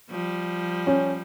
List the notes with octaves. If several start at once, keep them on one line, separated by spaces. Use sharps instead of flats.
F3 G3
C#4